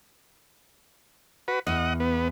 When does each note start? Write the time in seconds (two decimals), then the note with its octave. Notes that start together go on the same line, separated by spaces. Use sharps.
1.48 F#4 B4
1.67 E2 D#5 F#5
2.00 B3